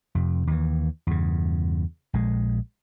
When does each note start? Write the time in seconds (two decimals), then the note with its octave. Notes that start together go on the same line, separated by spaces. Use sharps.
0.15 F2 C3
0.47 D#2 E3
1.07 E2 G2 C#3
2.14 A#1 G#3